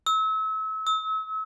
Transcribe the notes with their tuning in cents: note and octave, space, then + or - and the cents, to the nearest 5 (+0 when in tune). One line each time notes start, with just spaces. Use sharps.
E6 -35
E6 -40